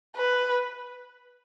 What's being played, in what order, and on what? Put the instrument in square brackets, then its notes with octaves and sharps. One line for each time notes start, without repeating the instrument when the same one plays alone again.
[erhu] B4